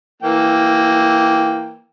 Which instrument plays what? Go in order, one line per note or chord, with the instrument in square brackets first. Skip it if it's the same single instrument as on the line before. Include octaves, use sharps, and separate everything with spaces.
[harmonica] E3 A#3 G5